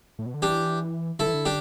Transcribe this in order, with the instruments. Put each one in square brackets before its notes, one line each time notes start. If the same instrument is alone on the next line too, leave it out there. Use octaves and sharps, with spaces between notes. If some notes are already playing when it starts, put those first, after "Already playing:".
[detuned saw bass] A2
B2
D3
[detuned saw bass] E3 [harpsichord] D4 G4
[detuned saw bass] D3 [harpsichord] E4 A4
[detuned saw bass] E3
D3
[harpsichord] D4 G4